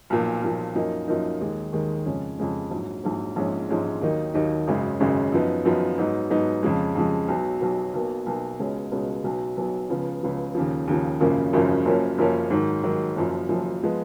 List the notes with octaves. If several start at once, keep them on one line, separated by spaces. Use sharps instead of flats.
B1 A#2 F3
B1 A#2 F3
F#2 F3 A#3 D#4
F#2 F3 A#3 D#4
D#2 D#3 G#3
D#2 D#3 G#3
F2 C#3 G#3 C#4
F2 C#3 G#3 C#4
A#1 G#2 F#3
A#1 G#2 F#3
A#1 G#2 F3 G#3 C#4
A#1 G#2 F3 G#3 C#4
D#2 D#3 F#3 A#3 D#4
D#2 D#3 F#3 A#3 D#4
G#1 F#2 C#3 G#3
G#1 F#2 C#3 G#3
F#2 F3 B3 D#4
F#2 F3 B3 D#4
G#2 F#3 B3 D#4
G#2 F#3 B3 D#4
F2 C#3 F3 G#3
F2 C#3 F3 G#3
B1 B2 F#3
B1 B2 F#3
B1 B2 A#3
B1 B2 A#3
C#2 B2 G#3 C#4
C#2 B2 G#3 C#4
B1 B2 F#3 B3
B1 B2 F#3 B3
C#2 C#3 F3 B3
C#2 C#3 F3 B3
D#2 C#3 F3
D#2 C#3 F3
G#1 F#2 C#3 F3 A#3
G#1 F#2 C#3 F3 A#3
F#1 F#2 F3 A#3 C#4
F#1 F#2 F3 A#3 C#4
G#2 D#3 F#3
G#2 D#3 F#3
F#1 F#2 F3
F#1 F#2 F3
F3 G#3 B3